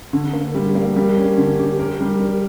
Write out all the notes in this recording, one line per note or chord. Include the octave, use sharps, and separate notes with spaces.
D3
A#3
G3
A#3
G3
C#4
D3
G4
A#4
G3
A#4